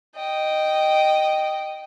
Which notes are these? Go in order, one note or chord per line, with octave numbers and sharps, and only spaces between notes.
D#5 G5